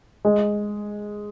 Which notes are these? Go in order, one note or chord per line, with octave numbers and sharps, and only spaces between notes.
G#3